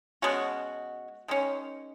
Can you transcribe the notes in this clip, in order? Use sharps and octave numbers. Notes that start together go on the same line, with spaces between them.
B2 G#3 C#4 F#4
D#3 G#3 C#4